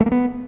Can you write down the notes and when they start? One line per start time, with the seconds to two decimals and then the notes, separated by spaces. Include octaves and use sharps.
0.01 A3
0.06 A#3
0.12 B3